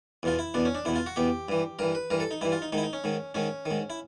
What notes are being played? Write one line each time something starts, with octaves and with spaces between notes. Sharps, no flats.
E2 B2 F4
E4
E2 B2 D4
C#4
D4
E2 B2 E4
F4
F#4
E2 B2 G4
G2 E3
G2 E3 A#4
B4
G2 E3 A#4
A4
D#4
G2 E3 E4
F4
D#4
G#2 D#3 D#4
E4
D#4
C#4
G#2 D#3
G#2 D#3 C#4
D#3
G#2
E4